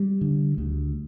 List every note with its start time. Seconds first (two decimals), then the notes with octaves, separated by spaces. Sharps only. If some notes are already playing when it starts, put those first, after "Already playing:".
Already playing: G3
0.21 D3
0.58 D2